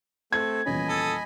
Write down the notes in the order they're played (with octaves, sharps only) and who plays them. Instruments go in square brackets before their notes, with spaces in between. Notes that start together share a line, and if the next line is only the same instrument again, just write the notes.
[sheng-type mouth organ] A3 C4 A4 [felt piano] G#6
[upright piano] D#1 E2 C#4 [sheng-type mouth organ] D#5 G#5 B5
[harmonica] A4 D#6